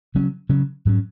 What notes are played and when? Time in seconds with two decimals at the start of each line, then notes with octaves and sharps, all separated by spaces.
0.15 C#3 F#3 C#4
0.49 C#3 F#3 C#4
0.85 G#2 F#3 C#4